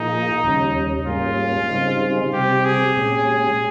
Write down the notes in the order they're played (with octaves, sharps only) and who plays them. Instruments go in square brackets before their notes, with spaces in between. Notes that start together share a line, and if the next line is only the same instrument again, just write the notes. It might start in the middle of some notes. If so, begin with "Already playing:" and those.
Already playing: [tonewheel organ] A#2 F3 A#3 F4 G#4 [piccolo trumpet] D#4
[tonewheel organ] D#2 C#3 G3 C#4
[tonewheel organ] G#2 G3 A#3 C#4 G#4 [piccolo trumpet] F4
[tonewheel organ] C#3 G3 C4 D#4 G#4
[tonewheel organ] C3 G3 C4 [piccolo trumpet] G4
[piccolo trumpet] G#4
[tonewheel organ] A#2 G#3 C#4 G4